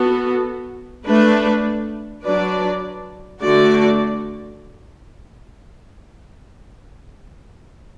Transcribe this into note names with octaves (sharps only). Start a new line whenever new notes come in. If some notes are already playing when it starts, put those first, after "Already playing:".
Already playing: B3 F#4 A4
A3 D4 B4
F#3 D4 B4 D5
D3 A3 F#4 D5